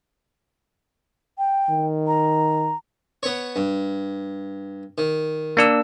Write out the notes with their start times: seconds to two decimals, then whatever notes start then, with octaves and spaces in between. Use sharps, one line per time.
1.38 G5
1.70 D#3
2.07 A#5
3.23 B3 C#5
3.56 G2
4.98 D#3
5.57 A#3 D4 E6